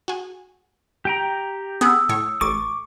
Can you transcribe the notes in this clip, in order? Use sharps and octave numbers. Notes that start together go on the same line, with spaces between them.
F#4 G#4
G4 G5 A#5
B3 G#4 F#5 D#6 E6
A2 C#5
A1 C#6 D6 A6